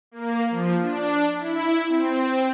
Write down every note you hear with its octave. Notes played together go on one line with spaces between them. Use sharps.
A#3
F3
D4
E4
C4